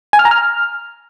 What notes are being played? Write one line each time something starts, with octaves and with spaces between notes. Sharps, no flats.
G#5
F6
A#5
F6